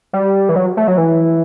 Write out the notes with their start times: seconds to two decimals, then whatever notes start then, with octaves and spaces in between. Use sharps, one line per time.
0.13 G3
0.49 E3
0.56 F#3
0.77 A3
0.87 F#3
0.98 E3